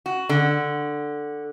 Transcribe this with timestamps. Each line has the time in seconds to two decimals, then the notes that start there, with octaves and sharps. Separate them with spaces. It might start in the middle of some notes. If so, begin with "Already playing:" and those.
0.06 F#4
0.29 D3